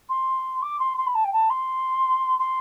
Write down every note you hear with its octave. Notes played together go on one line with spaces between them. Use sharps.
C6
D6
C6
C6
B5
A5
G5
A5
C6
C6